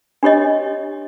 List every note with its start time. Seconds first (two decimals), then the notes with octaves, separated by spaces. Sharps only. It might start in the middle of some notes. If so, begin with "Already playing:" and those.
0.23 D4 G4 C#5 D#5